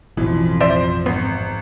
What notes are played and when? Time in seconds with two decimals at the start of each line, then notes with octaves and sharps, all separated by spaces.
0.17 A1 F2 B2 E3 F3
0.61 C5 D5 E5
1.06 G#1 B3